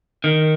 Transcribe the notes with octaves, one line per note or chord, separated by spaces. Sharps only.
D#3